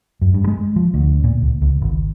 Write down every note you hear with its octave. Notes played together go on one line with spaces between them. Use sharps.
F#2
G2
G#3
F3
D2
A#2
C#2
C#2
G#1